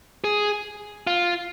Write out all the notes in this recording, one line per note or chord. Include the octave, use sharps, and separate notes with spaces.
G#4
F4